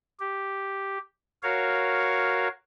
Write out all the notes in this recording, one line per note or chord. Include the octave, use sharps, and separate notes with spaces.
G4
F#4 A#4 C#5 F5